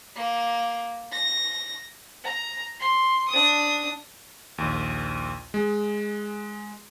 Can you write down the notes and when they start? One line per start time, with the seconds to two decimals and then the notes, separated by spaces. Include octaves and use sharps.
0.16 A#3
1.12 A#6
2.24 A#5
2.80 C6
3.29 D4 D#6
4.58 A#1 D#2
5.54 G#3